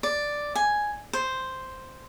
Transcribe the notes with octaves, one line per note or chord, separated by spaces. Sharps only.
D5
G#5
C5